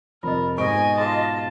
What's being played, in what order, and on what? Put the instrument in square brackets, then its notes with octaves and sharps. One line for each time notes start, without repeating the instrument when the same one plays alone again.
[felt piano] F1 [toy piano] F4 D#5 [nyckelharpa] A#4
[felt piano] G#2 B2 D7 [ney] D#5 [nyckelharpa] G#5 [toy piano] C#6
[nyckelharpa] F4 A5 [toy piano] F#4 G#4 C6